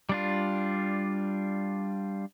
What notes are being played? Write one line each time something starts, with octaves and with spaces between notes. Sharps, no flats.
G3 D4 F4